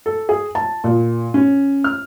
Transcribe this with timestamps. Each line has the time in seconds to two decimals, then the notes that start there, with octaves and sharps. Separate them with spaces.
0.06 A4
0.29 G#4
0.55 A5
0.84 A#2
1.34 C#4
1.84 F6